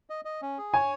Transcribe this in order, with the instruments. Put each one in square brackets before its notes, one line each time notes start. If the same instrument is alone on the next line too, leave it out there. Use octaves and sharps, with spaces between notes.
[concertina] D#5
D#5
C#4
G#4
[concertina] C#5 [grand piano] G#5